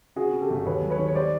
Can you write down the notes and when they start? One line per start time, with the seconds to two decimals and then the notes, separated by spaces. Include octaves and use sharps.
0.16 C#3 F#4 G#4
0.33 C#3
0.41 G4 A4
0.50 G1
0.66 D#2 B4 C#5
0.82 F#3
0.90 B4 C#5
0.99 D#3
1.08 C#5
1.15 G3 C5 D5